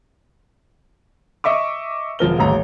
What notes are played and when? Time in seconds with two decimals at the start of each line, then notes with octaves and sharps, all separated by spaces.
1.44 D#5 E5 C#6 D6
2.19 E1 F3 A#4 G7
2.38 D#1 A1 A#5